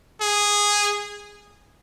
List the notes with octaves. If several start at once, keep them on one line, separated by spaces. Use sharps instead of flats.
G#4